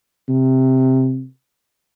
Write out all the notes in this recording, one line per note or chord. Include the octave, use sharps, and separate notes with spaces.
C3